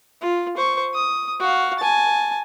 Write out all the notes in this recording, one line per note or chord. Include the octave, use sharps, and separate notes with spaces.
F4
C5 C#6
D#6
F#4 F5
G#5 A5